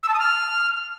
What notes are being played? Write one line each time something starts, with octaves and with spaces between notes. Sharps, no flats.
E6
A5
D#6
F6